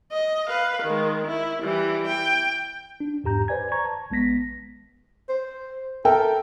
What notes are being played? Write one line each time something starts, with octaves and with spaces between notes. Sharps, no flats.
D#5
B4 F5
D#3 G#3
E4
E3 G3
G5
D4
E2 G#2 G4 A#5 G6
B4 C5 D5 G#5 G#6
A#5 C#6 G#6
A5
A#1 G#3 B3 A#6 B6
C5
A4 A#4 E5 G5